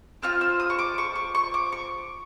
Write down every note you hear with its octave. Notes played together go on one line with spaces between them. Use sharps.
C4 F4 F6
E6
D#6
C#6
D6
C#6
C#6
C#6
D6
C#6